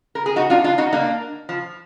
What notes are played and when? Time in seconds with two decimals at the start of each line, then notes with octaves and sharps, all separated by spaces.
0.15 A#4
0.26 G#4
0.36 D#4 F#4
0.50 D4 F4
0.64 D4 F4
0.78 D#4 F#4
0.93 A#3 D4
1.49 F3